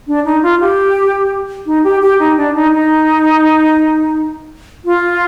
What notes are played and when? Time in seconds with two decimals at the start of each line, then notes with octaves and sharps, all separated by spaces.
0.07 D4
0.25 D#4
0.43 F4
0.61 G4
1.66 D#4
1.84 G4
2.02 G4
2.19 D#4
2.37 D4
2.55 D#4
2.72 D#4
4.85 F4